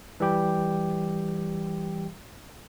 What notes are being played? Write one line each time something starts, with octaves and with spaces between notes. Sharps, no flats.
E3 G3 G4 G5